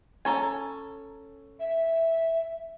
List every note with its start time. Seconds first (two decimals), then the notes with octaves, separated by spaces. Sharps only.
0.25 C#4 A4 C#5 G#5 A#5
1.60 E5